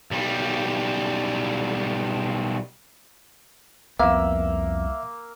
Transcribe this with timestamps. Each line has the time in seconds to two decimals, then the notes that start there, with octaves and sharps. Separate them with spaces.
0.11 B1 G3
4.00 C2 F2 A#3 B3 E5 E6